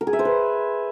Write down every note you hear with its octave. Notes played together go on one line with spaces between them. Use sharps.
A#4
G#4
E5
C5
B4